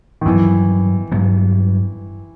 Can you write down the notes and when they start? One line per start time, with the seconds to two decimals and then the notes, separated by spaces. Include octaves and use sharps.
0.21 D#3
0.26 G2 E3 F#3 B3
1.12 G2 F#3 B3